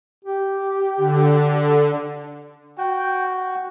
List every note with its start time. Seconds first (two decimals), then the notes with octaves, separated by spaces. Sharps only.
0.25 G4
0.97 D3
2.78 F#4 G5